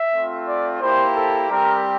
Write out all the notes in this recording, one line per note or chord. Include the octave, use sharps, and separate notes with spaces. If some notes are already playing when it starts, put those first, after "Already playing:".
Already playing: E5
A3 C4 F4
D5
A#3 E4 G4 C5
A4
G3 C4 G4 A#4